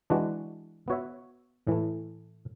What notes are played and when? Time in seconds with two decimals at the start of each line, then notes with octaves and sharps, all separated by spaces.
0.10 E3 G#3 D4 F#4
0.88 B3 F#4 C#5 E5
1.67 A2 E3 A3